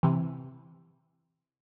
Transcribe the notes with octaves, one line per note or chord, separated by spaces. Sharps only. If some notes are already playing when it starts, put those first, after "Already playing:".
C3 E3